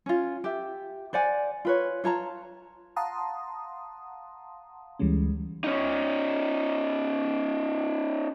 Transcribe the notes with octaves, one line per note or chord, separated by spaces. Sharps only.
C#4 F4
G4 E5
C5 D5 F#5 G#5
F4 B4 C#5
F4 C#5 A5 A#5
F5 F#5 A5 A#5 C6 D#6
D2 E3 G3 G#3 C#4
C#4 D#4